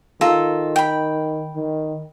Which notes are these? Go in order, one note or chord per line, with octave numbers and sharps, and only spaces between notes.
D#3 F4 A4 A#5
G5 B5
D#3